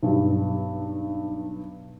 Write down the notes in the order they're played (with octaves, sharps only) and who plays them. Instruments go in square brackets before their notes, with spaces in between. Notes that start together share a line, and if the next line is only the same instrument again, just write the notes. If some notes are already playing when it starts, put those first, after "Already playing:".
[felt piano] B1 G2